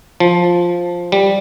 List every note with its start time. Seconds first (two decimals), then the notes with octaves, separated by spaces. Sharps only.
0.20 F3
1.12 G3